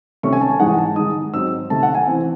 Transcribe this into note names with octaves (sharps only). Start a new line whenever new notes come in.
C3 D#3 A3 C#4 C#6
G#5
A5
G#5
G#2 E3 G#3 D#4 F#5
G#5
A5
D#3 G#3 D#4 D#6
G#2 F#3 C4 D#4 E6
C3 D#3 A3 A5
F#5
G#5
E3 C4